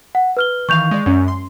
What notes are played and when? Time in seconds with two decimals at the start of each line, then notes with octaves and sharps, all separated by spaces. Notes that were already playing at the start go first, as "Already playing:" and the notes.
0.15 F#5
0.37 B4 F6 G7
0.69 D#3 E3 F5 C#6 G6 F7
0.91 G#3 D5
1.06 F#2 C#4
1.28 C6